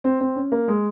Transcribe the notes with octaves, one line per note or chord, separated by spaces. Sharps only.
C4
C4
C#4
A#3
G#3